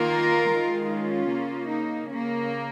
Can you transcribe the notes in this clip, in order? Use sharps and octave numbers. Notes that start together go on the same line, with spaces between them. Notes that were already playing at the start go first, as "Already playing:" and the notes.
Already playing: D#3 A#3 F4 A#4
D#3 G#3
C#4 F4
C#3 A#3
D#4
C#3 A#3 C#4